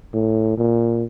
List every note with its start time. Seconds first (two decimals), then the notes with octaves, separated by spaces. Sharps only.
0.14 A2
0.58 A#2